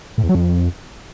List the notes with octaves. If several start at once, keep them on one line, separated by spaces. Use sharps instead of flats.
A2
E2
F#3
F2